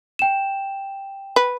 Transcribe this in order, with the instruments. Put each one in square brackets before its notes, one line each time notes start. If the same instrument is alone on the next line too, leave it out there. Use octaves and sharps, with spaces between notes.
[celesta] G5 E7
[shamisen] B4